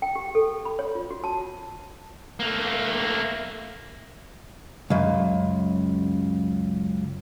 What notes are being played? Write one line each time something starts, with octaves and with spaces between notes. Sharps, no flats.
G5
G4
A4
B5
C#5
F4
F#4
A5
A3 A#3
C#2 F#2